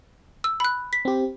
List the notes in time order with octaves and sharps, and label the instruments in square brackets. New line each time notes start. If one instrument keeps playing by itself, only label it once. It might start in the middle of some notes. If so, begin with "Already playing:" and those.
[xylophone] E6
B5 F#6
B6
[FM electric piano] C4 G4